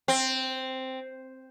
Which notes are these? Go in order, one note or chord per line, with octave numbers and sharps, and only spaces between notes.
C4